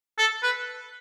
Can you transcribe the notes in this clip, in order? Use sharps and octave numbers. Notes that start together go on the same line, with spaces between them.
A4
B4